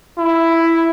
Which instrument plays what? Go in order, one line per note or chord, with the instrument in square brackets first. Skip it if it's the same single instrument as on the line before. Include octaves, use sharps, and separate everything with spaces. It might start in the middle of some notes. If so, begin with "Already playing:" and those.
[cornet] E4